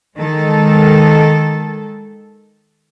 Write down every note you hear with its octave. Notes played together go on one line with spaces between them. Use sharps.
D#3 G#3 A4